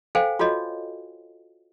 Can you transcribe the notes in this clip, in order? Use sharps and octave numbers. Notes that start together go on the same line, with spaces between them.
A4 C5 F5 G5 G#5
F4 F#4 A4 C#5 D#5